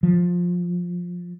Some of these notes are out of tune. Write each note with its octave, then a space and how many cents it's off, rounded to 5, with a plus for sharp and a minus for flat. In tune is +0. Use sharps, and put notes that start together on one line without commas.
F3 +15